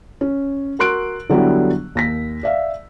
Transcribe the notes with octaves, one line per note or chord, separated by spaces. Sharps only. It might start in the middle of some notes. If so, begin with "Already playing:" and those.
C#4
F#4 A#4 C6 F#6 D7
D3 F#3 G3 B3 E4
D#2 A#6 B6
D5 E5 F5